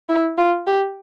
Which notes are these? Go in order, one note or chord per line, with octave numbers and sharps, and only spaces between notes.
E4
F4
G4